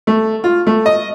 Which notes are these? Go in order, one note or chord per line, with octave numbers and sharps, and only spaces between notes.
A3
F4
A3
D#5